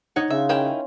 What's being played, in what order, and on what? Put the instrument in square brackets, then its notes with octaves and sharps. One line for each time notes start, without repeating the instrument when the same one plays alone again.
[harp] D#4 C#5 F#5
[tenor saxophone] C#3 [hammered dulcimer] F4 [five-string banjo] E5
[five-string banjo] D#3 E4 G5 [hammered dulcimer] C#4